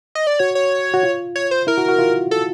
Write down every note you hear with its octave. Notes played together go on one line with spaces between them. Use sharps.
D#5
D5
F#4 C#5
C#5
F#4
F4
C#5
C5
E4 A#4
F#4
F#4
F4
A4